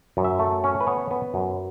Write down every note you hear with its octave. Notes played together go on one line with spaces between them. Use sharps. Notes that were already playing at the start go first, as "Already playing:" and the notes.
F#2
E5
A3
C#4
B4
B3 C#5
B3
F#2